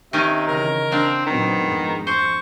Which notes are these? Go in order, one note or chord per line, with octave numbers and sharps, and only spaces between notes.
C3 D#3 C#4 D#4 E5
C#3 E3 A#4
A#3 C4 D4
A#2 D#3 F#3 B3 C4
G#1 F2 G#3
C5 C#6